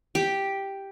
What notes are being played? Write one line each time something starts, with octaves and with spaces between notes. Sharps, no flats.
G4